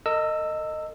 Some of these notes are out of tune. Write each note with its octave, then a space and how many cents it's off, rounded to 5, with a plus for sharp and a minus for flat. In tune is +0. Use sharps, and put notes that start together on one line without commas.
A#4 -45 D#5 -5 E6 +0